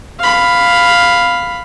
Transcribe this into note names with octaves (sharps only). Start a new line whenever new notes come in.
F5 B5